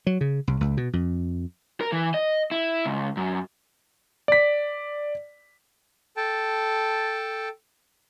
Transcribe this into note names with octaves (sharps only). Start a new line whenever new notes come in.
F#3
C#3
C2
C#2
B2
F2
A#4
E3
D#5
E4
C#2
F#2
D5 B6
A4 G5 A5